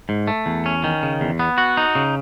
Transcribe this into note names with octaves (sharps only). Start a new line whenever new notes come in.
G#2
A3
E2
C#4
D#3
C#3
E2
B3
F#4
D#4
C#3